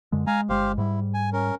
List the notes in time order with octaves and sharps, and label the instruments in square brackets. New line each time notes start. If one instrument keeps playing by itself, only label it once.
[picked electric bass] F#2 D3 G#3
[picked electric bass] G#3 [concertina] F5 G#5 A#5
[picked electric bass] G1 G#3 [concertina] G4 C5 F5
[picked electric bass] G#2 G3 [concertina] E4
[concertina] G#5
C#4 A#4